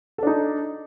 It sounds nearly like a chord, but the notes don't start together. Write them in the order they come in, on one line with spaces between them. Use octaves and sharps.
A4 D4 D#4